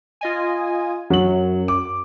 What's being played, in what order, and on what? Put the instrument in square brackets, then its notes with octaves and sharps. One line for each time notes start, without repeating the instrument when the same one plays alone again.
[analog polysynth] F4 D#5 G#5
[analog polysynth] F#2 [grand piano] F#3 F#7
[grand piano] D6